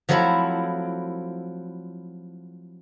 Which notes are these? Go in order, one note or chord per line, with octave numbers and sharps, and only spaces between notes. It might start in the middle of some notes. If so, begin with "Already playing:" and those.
F3 F#3 A3 C4 E4